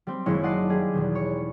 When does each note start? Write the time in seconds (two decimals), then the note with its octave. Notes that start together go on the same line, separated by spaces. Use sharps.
0.07 G3 C4
0.26 F#1 D#3 G#3 E4 C#5
0.43 D5 D#5 F#5 A5 C7
0.69 G3 G#4
0.94 E2 B2 D#3
1.15 C#5